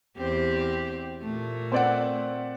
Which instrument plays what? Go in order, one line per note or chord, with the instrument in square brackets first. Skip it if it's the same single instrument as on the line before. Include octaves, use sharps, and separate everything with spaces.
[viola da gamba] E2 C4 G4
A#2 A3
[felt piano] C4 D5 F#5